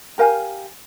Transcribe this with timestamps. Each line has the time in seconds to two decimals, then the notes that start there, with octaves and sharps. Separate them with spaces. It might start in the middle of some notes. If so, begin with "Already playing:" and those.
0.18 G4 A#4 F5 G#5